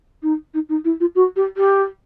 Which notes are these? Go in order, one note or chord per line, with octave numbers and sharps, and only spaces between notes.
D#4
D#4
D#4
E4
F4
F#4
G4
G4